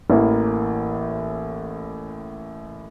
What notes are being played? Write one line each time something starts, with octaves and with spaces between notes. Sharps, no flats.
A1 A2 E3 A#3